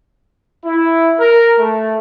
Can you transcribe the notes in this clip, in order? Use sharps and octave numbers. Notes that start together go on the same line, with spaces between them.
E4
A#4
A3